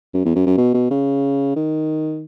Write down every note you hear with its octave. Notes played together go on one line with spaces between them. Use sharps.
F#2
E2
F#2
F#2
B2
B2
C#3
D#3